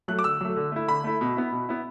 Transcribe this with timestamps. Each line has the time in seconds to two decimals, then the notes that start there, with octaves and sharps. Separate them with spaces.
0.08 F#3 A3 F#6
0.19 D6
0.24 D3 E6
0.41 F#3 A3
0.56 D3
0.72 A3 E4
0.88 D3 B5
1.04 A3 E4
1.21 B2
1.37 B3 E4
1.52 B2
1.69 B3 E4